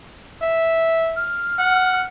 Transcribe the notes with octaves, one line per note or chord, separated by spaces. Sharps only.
E5
F6
F#5